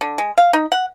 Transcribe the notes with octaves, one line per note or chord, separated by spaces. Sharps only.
D3
G#3
F5
D#4
F#5